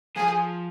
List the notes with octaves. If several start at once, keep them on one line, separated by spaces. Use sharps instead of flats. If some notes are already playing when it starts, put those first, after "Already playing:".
F3 G#4